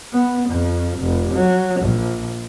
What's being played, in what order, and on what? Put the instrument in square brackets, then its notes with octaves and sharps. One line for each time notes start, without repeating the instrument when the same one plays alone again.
[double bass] B3
F2
F1
F#3
A#1